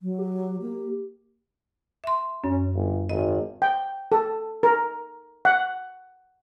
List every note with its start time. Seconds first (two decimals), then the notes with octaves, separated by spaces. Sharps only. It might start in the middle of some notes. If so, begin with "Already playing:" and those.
0.02 F#3
0.18 G4
0.62 A#3
2.04 E5 C6
2.44 F#2 C#4
2.75 G1
3.09 G#1 D#5
3.62 G5
4.12 A4
4.63 A#4
5.45 F#5